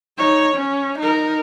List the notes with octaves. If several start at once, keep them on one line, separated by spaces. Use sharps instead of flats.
D#4 C#5
C#4
D#4 A#4